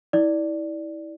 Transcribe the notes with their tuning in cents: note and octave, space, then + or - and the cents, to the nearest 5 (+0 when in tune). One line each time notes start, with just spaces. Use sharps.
E4 -30 D5 +0